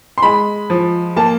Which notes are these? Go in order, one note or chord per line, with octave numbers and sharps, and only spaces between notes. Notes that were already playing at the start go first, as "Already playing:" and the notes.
C6
G#3 B5
F3
A#3 A5